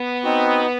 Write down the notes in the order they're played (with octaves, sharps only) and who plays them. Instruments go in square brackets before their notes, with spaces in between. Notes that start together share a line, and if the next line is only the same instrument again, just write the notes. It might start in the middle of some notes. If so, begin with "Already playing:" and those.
Already playing: [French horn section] B3
[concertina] C4 D#4 F#4